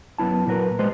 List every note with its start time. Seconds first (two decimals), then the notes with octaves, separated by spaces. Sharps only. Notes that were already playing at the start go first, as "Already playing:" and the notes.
0.18 F#2 F#3 B3 E4 A5
0.47 A#2 F#3 A#4 B4
0.79 G3 G#3 B4 C5